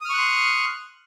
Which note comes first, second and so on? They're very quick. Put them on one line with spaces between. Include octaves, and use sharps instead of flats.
D#6 F6 C#6 F#6 C6